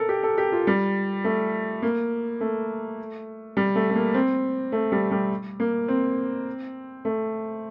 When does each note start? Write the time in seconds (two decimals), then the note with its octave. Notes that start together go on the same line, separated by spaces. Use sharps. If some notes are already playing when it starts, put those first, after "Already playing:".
Already playing: A4 A#4
0.09 G4
0.23 A4
0.38 G4
0.52 F4
0.67 G3
1.24 A3
1.82 A#3
2.41 A3
3.57 G3
3.75 A3
3.90 A3
3.96 A#3
4.14 C4
4.72 A3
4.92 G3
5.11 G3
5.60 A#3
5.88 C4
7.05 A3